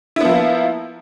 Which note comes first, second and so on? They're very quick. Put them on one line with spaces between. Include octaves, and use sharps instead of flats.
E4 B3 F3 A#3